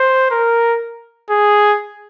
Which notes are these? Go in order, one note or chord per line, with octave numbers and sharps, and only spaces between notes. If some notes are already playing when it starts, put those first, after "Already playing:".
Already playing: C5
A#4
G#4